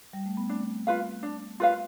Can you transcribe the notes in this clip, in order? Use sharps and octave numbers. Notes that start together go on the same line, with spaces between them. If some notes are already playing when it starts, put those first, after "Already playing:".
G3
A3
B3
A3 C4 D4
F4 B4 F5
D4
F4 B4 F5